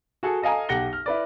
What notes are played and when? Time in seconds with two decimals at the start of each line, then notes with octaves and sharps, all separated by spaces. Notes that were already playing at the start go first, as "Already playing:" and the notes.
0.23 F#4 G#4 A4
0.42 A4 D#5 F5 G#5 A#5
0.69 B1 G4 F#5 A#6 G7
0.93 F6
1.06 E4 B4 D5